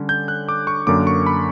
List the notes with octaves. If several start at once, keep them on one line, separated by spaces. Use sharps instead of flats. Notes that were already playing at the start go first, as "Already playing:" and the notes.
Already playing: D3 G3 C#4
G6
F#6
D6
C#6
F#2 D3 A#3 D6
C#6
B5